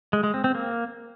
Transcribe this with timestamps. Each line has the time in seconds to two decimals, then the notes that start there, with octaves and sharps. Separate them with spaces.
0.13 G#3
0.23 G#3
0.34 C4
0.44 C4
0.55 A#3